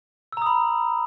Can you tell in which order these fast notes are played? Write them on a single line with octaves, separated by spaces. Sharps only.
E6 A#5 D#6 B5